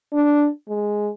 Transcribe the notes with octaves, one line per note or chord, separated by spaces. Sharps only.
D4
G#3